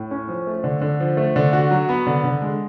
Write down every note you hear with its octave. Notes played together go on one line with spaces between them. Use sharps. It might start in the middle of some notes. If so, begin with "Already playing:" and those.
Already playing: A2
C#4
F3
A3
D3
D3
F3
A3
D3
F#4
F#3
B3
D3
D3
G#3